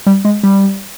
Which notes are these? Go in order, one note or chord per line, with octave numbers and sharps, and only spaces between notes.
G3
G#3
G3